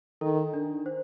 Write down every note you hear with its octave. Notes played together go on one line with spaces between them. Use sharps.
D#3 A4
D4
C5